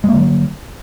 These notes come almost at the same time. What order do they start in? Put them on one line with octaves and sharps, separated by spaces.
G#3 A#3 D3 F#3